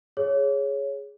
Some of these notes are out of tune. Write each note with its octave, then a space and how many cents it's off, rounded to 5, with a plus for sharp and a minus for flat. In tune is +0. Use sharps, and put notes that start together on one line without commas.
G#4 +0 C#5 +0